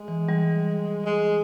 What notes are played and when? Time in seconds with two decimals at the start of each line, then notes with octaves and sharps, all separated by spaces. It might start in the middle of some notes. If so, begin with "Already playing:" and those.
Already playing: G#3
0.08 E3
0.29 E3 G3
1.06 G#3